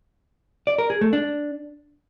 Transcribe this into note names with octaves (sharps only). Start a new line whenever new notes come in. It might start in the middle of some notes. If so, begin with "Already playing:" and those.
D5
A#4
G#4
A3
D4